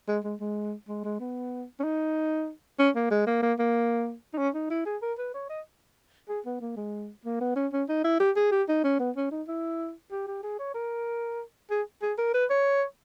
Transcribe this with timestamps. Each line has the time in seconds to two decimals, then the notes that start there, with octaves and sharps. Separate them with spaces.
0.08 G#3
0.24 G#3
0.40 G#3
0.88 G#3
1.04 G#3
1.20 B3
1.80 C#4
1.84 D#4
2.79 C#4
2.95 A#3
3.11 G#3
3.27 A#3
3.42 A#3
3.59 A#3
4.33 D#4
4.38 C#4
4.55 D#4
4.70 E4
4.86 G#4
5.02 A#4
5.18 B4
5.34 C#5
5.49 D#5
6.29 G#4
6.46 B3
6.61 A#3
6.76 G#3
7.25 A#3
7.41 B3
7.56 C#4
7.73 C#4
7.89 D#4
8.04 E4
8.20 G4
8.36 G#4
8.51 G4
8.68 D#4
8.84 C#4
8.99 B3
9.16 C#4
9.31 D#4
9.48 E4
10.11 G4
10.27 G4
10.43 G#4
10.59 C#5
10.74 A#4
11.71 G#4
12.02 G#4
12.18 A#4
12.34 B4
12.50 C#5